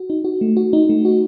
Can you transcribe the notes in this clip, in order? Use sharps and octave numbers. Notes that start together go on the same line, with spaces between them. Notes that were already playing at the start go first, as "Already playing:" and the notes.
Already playing: F#4
D#4
F#4
A3
F#4
D#4
A3
F#4